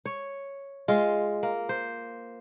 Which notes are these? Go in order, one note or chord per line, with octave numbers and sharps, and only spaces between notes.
C#5
G#3 F4
A#3
C5